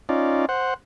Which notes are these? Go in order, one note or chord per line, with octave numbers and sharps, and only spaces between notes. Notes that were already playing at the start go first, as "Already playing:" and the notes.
C#4 D#4 F4 D5
C5 F#5